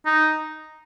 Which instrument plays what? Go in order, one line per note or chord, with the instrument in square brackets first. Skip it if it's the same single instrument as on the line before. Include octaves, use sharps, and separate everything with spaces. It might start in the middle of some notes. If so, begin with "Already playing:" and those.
[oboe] D#4